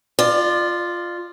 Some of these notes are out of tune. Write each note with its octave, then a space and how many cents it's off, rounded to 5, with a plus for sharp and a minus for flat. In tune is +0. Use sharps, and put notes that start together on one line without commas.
F4 +0 D5 +35